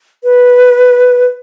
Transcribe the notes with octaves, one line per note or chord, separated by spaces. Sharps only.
B4